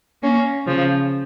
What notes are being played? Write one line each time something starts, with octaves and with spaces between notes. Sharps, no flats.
A#3 C#4
C#3 F3